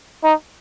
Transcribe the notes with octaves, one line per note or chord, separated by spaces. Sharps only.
D#4